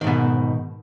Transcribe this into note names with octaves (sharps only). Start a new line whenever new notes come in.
G#2 B2 D#3